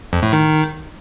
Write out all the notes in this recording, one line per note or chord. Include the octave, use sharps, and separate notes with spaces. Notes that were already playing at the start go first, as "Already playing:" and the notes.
F2
A2
D#3